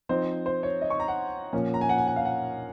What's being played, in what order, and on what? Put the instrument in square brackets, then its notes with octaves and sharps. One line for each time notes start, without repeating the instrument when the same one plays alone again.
[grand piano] F3 C4 D#4 C5
C5
C#5
D#5
C#6
A#5
F#5
A#2 F3 A#3 C#4
A#5
G#5
F#5
G#5
F#5
F5
F#5